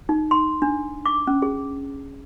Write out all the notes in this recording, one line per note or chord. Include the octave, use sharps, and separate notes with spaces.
D#4
C6
D4
D6
C#4
G#4